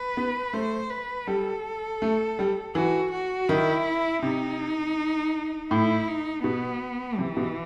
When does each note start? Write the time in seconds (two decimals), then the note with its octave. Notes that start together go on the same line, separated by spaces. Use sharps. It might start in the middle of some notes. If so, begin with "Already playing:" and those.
Already playing: B4
0.17 B3
0.53 A3 C5
0.90 B4
1.27 G3 A4
2.02 A3
2.39 G3
2.75 E3 F#4
3.12 F#4
3.49 D#3 E4
4.22 C3 D#4
5.71 A2 E4
6.08 D#4
6.44 B2 B3
7.18 C3 E3
7.37 B2